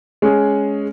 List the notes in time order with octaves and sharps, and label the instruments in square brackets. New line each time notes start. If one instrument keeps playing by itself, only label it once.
[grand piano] G#3 C#4 G#4